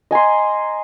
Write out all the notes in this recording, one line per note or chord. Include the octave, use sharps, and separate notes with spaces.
D#5 G#5 A#5 C6